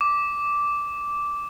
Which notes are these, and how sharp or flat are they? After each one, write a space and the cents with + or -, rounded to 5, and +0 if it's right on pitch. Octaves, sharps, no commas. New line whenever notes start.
D6 -10